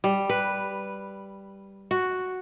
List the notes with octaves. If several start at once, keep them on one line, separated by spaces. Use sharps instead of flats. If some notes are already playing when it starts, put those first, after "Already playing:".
G3
B4
F#4